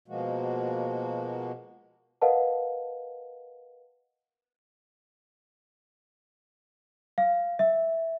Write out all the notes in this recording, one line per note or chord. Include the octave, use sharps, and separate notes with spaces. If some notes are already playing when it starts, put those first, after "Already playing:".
B2 F3 G#3 A#3 F#4
A#4 B4 D#5 F5 F#5 A5
F5
E5